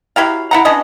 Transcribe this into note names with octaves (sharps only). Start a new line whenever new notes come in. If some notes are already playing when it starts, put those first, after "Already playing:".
F#3 E4 G4 F5
E4 F#5 A#5
B2 C#4 D4 D#5